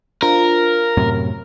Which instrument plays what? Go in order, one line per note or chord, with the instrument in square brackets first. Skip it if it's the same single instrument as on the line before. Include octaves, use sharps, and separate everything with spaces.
[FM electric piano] D4 F4 C5 [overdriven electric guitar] A#4
[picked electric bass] F#2 A2 C3